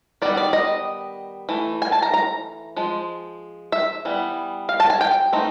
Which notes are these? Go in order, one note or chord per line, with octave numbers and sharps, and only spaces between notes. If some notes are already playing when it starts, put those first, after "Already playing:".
D#3 G3 B3 D5
D5
D#5
E3 A3
G#5
A5
A#5
A#5
F3 G#3
E5
E3 G3 B3
F5
A5
G#5
G5
E3 A3 C4 D#4